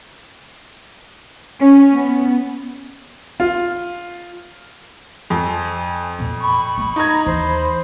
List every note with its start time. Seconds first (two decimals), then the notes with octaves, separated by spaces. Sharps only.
1.60 C#4
1.93 B3
3.40 F4
5.30 F2 G#5
6.19 E2 A#2
6.41 B5 C#6
6.78 A#3
6.96 D#4 A#5 G#6
7.26 D#2 E3 C5